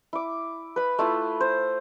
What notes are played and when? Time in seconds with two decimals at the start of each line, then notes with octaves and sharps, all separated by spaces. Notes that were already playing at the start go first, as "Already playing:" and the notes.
0.13 E4 D6
0.76 B4 B5
0.99 A3 E4 F4
1.40 C5